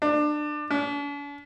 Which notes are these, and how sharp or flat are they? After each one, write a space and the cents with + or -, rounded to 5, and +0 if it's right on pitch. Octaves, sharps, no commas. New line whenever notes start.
D4 +25
D4 -45